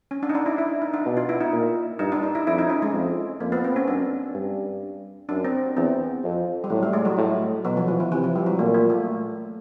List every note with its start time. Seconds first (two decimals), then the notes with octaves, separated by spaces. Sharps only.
0.11 C#4
0.23 D4
0.29 D#4
0.35 D4
0.46 E4
0.58 E4
0.82 D#4
0.94 D4
1.06 B2
1.17 F4
1.29 E4
1.41 D#4
1.52 A#2
1.99 G2 D#4
2.12 D4
2.23 D#4
2.35 E4
2.47 F2 E4
2.58 D#4
2.70 C#4
2.82 G#3
2.93 F2
3.40 F2 A#3
3.52 B3
3.64 C4
3.76 C#4
3.88 F#2 D4
4.35 G2
5.29 F#2 D4
5.44 C4
5.77 E2 C4
6.24 F2
6.64 G3
6.70 A2 F#3
6.83 G3
6.93 G#3
7.05 F#3
7.17 A2
7.65 B2 F#3
7.77 F3
7.88 E3
8.00 E3
8.12 C3 E3
8.24 F3
8.36 G3
8.46 F#3
8.59 A#2 A3
8.74 A#3
8.90 A3